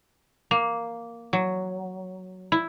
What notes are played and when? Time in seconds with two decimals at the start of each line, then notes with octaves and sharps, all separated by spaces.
0.51 A#3
1.33 F#3
2.52 E4